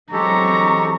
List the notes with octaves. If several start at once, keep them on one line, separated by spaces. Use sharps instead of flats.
E3 F#3 G#3 C4 G4 A4 A#5 C#6